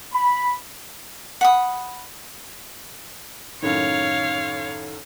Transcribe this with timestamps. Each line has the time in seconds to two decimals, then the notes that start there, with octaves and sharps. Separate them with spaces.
0.14 B5
1.41 F#5 B5 D#6
3.62 F#2 A2 D#3 C#5 F5